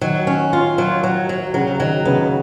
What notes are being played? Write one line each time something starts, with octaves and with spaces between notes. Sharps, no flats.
D#3 F#3
C#4
F4
F#3
F#3
F#3
C#3 F#3
D#3 F#3
C#3 B3